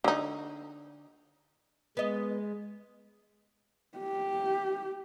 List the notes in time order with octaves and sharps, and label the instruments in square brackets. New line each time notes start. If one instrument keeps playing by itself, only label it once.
[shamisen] D3 D#4
[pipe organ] G#3 [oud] B3 D#5
[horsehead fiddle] G4